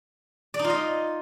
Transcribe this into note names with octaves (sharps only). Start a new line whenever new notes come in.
D5
D#4
F4
D#5